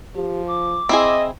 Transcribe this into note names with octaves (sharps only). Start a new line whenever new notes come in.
F3 G4
D6
C4 E4 G#4 D#5